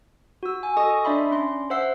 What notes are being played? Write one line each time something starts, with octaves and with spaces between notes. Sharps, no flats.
F#4 E6
G#5
A4 D#5 C#6 D#6
D4 D5 E5 B5 C6
C#4 C6
C5 E5 F#5 E6 C7